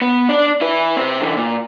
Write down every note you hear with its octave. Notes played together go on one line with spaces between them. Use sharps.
B3
D4 D5
E4 B4
C3 C4
D3 E3
A#2